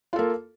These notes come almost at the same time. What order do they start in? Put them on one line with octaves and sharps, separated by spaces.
F4 A4 A#3